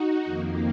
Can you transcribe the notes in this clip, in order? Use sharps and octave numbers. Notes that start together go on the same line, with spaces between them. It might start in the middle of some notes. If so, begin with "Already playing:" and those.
Already playing: D#4 F#4
F2 D#3 A#3